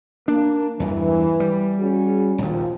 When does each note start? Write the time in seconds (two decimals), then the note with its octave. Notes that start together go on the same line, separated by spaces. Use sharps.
0.28 A#3 D4
0.80 E2 G2 E3
1.40 G3
1.79 C#4 F#4 G#4
2.38 A#1 D#2 F3